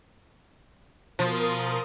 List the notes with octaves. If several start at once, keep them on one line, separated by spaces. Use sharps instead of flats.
B2 F3 A#4 C6 D#6 A6